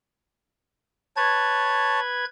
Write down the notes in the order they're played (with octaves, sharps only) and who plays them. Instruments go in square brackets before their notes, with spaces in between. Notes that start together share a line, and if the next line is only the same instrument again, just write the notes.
[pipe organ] B4 G#6 [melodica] C#5 A5